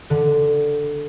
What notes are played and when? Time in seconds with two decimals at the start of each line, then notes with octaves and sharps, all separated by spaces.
0.10 D3